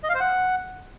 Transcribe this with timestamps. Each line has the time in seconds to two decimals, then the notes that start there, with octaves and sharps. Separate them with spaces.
0.04 D#5
0.09 F5
0.15 C5
0.20 F#5